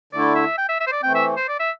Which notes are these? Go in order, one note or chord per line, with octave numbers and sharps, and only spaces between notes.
D3 A3 E4 D5
E5
G5
E5
E5
C5
D5
E3 A3 C4 G5
E5
C5
D5
E5